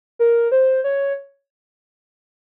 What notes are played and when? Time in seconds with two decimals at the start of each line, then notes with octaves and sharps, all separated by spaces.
0.19 A#4
0.52 C5
0.84 C#5